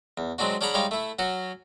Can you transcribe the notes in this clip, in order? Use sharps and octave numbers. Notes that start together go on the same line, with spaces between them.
E2
F#3 G#3 C4 D4 F#4
C#4 D4 G#4 F#5 A#5 B5
G3 G#3 D#4 G4 C#5 F5
A3 E4
F#3 C#4 F#4 C#5